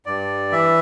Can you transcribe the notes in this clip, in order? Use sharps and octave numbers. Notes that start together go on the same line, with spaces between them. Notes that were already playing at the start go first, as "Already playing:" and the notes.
G2 D5
E3 E5